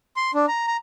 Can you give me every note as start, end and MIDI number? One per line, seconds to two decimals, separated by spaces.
0.16 0.31 84
0.34 0.46 62
0.48 0.67 82
0.67 0.77 82